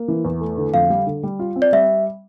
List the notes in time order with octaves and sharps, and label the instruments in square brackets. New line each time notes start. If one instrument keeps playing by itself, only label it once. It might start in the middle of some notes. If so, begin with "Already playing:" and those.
Already playing: [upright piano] A#3
E3
E2
A3
D3
[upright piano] F2 [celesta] F5
[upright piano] G3
D3
G3
F4
C4
[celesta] D5
[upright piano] G3 [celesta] E5